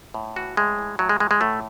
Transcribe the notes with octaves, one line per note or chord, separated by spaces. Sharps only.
A2
E3 F#4
A2 G#3
E3
A2 F#3
G#3
E3 G#3
G#3
A2 A3